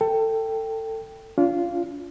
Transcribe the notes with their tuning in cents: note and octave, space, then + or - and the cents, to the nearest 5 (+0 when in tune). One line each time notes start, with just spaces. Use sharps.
A4 +25 G5 +0
D4 -45 F4 -15